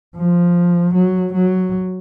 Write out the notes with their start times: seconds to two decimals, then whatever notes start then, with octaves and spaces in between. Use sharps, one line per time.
0.16 F3
0.94 F#3
1.34 F#3